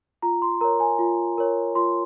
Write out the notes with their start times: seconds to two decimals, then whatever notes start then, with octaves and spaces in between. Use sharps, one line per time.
0.22 F4 A#5
0.42 C6
0.61 A#4 C#5 A#5
0.80 G#5
0.99 F4
1.38 A#4 C#5
1.75 F4 C6